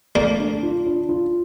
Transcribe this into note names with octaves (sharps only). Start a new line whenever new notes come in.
A#2 A3 A#3
D4
F4
D4
F4